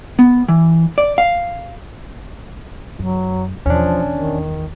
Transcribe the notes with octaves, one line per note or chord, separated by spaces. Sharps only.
B3
E3
D5
F5
F#2 F#3
E2 B2 F3 C#4 D4
D#3